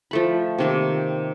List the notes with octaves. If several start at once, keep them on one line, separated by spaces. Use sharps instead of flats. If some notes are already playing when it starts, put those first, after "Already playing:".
F3 A3 B5
C3 D#3 A#3